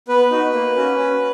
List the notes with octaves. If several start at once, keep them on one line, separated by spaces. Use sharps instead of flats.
B3 B4
D#4 F#4
A#3
C#4 F#4
C#4